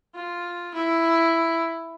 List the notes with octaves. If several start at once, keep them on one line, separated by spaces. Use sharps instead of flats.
F4
E4